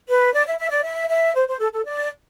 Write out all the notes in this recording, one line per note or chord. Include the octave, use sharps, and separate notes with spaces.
B4
D5
E5
E5
D5
E5
E5
C5
C5
A4
A4
D5